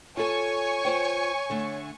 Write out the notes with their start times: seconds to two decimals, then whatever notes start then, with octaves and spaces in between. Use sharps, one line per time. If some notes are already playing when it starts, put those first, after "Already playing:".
0.17 F4 A4 C#5 G#5 C#6
0.85 F4 C5 G5
1.50 D3 A3